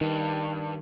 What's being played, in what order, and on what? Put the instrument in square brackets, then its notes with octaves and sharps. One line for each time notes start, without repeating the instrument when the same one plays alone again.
[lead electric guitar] G2 [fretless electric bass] D#3